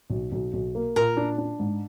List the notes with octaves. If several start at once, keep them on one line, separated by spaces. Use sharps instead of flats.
B1
B1
B1
A#3
A#2 A#4
D4
D4
G#2